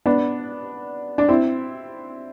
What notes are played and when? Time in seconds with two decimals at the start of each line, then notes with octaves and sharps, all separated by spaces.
0.06 B3 D4
1.18 D4
1.28 C4 E4